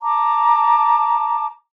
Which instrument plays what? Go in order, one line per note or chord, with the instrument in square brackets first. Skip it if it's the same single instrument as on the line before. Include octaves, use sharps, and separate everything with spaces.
[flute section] A5 A#5 D6